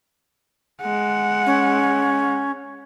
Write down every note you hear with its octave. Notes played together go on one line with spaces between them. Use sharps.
G#3 F#5
C#4